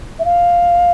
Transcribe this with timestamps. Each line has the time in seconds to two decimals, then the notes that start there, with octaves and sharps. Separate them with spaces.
0.19 E5
0.25 F5